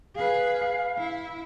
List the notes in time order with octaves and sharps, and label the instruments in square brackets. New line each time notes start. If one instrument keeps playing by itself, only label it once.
[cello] G#4 B4 [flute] F5
[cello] E4